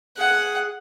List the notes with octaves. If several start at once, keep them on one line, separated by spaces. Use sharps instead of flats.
G#4 F#5
G#4